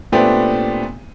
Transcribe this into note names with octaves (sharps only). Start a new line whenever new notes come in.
A#2 A3 B3 C4 D4 G4